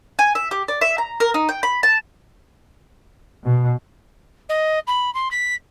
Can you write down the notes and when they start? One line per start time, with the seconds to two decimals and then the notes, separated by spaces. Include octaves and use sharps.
0.19 G#5
0.35 E5
0.51 G4
0.68 D5
0.81 E5
0.98 A#5
1.20 A#4
1.34 D#4
1.49 G5
1.63 B5
1.83 A5
3.44 B2
4.49 D#5
4.87 B5
5.14 C6
5.31 B6